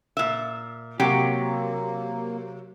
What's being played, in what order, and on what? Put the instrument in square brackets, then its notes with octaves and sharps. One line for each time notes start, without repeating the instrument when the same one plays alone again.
[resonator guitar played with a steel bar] A#2 E5
[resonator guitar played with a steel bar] C3 F#3 [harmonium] A#3 [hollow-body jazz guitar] G4